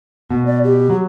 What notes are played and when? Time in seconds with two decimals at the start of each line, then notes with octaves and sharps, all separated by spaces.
0.31 B2 A#3
0.46 D5
0.64 G4
0.90 F#3